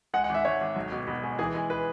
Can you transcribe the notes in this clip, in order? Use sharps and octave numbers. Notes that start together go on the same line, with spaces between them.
G#3 F#5
F#5
G#1
E5
G#1 C#5
G#1
B1
B2
B2
G#3
E3 G#4
G#3
B4